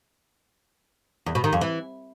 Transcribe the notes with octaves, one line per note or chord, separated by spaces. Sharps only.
E2
B2
D#3
F2
E3